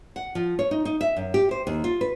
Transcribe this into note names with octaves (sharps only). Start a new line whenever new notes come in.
F#5
F3
C#5
D#4
D#4
E5
F#2
G4
C5
D#2
F4
B4